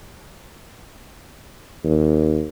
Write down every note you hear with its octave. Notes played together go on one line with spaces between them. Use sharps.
D#2